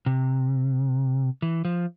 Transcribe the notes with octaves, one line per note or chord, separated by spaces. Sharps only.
C3
E3
F3